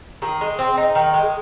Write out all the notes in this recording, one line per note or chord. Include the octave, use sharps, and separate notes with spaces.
D#3 G#4
G#3
C4
D#4
D#3
G#3